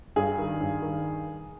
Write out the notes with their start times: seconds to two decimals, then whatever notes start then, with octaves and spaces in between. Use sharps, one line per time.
0.16 G2 G#4
0.38 D#3
0.60 G2
0.82 D#3